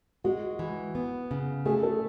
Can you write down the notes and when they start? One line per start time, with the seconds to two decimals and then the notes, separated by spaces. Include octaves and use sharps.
0.24 G#3 F#4
0.59 E3
0.95 B3
1.31 C#3
1.66 A3 G#4
1.83 A4